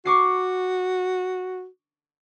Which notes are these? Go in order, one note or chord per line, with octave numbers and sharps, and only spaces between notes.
F#4 C#6 D6 C7